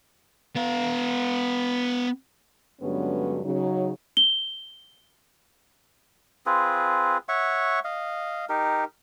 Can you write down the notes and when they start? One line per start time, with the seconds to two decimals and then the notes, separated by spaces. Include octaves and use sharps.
0.56 B3 F5
2.81 G2 D3 F#3 G#3 B3 C#4
3.43 C#3 F#3 D#4
4.17 G7
6.46 C4 F4 G#4 B4
7.29 C#5 E5 F#5 C#6
7.85 D#5 F5
8.49 D#4 G4 A#4